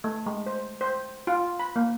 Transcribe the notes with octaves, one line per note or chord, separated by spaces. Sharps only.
A3
G#3
C5
C5
F4
B5
A#3